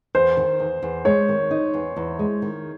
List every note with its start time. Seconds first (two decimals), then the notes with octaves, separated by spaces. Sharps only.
0.15 E2 C5
0.37 D#3
0.59 E2
0.83 E2
1.05 G#3 C#5
1.28 D#3
1.51 D#4
1.74 E2
1.96 E2
2.19 G#3
2.42 D#3